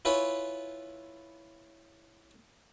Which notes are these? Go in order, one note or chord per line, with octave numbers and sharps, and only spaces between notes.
E4 F4 B4 C#5 G#5